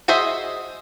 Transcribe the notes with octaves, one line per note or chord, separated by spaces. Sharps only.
F#4 G#4 C5 D#5 E5